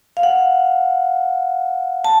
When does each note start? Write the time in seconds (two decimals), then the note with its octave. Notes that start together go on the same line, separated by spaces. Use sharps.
0.17 F5
0.23 F#5
2.04 A5